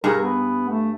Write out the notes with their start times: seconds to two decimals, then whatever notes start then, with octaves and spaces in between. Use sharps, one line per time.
0.04 G2 G#4 A#4
0.21 B3
0.68 A3